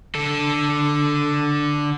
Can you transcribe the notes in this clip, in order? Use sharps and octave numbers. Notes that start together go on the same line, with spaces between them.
D3 A4